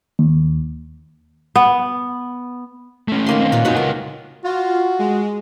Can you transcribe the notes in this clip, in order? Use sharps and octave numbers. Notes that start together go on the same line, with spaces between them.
D#2
B3
A3 C#4
D#3 A#3 C6
C4 C#4
A#2 C#4 F4 B4
D#4 F#4 B4 F#5 G#5
C#2 F4 A#4
F4 F#4
G#3